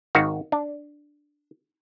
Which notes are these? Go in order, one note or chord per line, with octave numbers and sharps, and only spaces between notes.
G#1 D#3 F#4 F5
D4